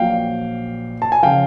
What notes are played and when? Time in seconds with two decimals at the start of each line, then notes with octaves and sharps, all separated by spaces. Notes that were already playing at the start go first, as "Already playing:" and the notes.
Already playing: A#1 A#2 F#3 F5 G5
1.02 A5
1.12 G#5
1.23 C#3 F3 F5 G5